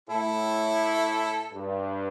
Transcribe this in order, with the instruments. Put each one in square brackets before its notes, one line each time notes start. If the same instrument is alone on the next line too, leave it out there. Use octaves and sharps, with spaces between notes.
[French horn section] A2 [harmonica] E4 A4
[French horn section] G2